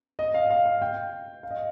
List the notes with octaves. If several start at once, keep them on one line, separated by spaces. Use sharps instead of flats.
D#5
F5
F5
F5
G5
F5
D#5